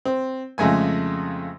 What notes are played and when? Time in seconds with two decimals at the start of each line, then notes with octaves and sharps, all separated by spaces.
0.05 C4
0.58 F2 C#3 G#3 A3 G#5